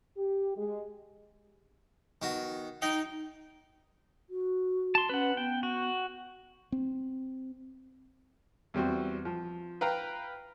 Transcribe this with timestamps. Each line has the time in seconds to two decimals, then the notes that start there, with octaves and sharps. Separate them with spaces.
0.17 G4
0.56 G#3
2.22 D#3 B3 F#4
2.82 D#4 D#5 G5
4.30 F#4
4.95 A5 C6
5.09 C#4 B4 F#5
5.37 B3 G5
5.63 F#4
6.72 C4
8.74 E2 G3 C4 F#4
9.25 F3
9.81 B4 F5 G5 A#5